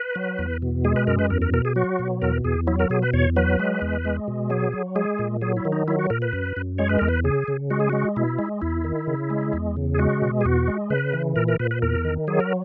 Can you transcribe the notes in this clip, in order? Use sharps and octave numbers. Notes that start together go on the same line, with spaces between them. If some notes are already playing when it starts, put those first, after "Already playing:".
Already playing: B4
F#3
E2
B2
G#3 G#4
B4
F#2 A#4
B4
E2 A#4
A#4
B2 A#4
G#4
F#3 F#4
B2
E2 A#4
E2 G#4
F#3 E4
A#4
B2 G#4
B4
E2 C#5
F#3 B4
G#3
E2
G#3
B2
F#3 G#4
F#3
G#3 G#4
A#2
F#3 G#4
E4
D#3
D#4
F#3 E4
F#4
A#2 A#4
B4
F#2
F#2
G#3 C#5
B4
E2 A#4
B4
C#3 G#4
C#3
G#3 F#4
G#4
G#3 F#4
B2 E4
G#3
E2 E4
D#3
C#3
G#3
E2
C#3
G#4
G#3 F#4
B2
G#4
E2 F#4
G#3
C#3 B4
E3
A#2 A#4
A#4
A#2 B4
B4
E2 A#4
D#3
F#3 G#4
A#4